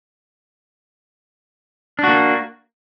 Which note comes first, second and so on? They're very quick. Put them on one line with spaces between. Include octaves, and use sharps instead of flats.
D4 F#4 A#3